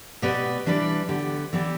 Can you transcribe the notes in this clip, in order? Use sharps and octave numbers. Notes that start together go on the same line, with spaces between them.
B2 B3 G4 B4 D5
E3 G3 D4 B4 D5
D3 B3 G4
E3 B3 E4 G4 D5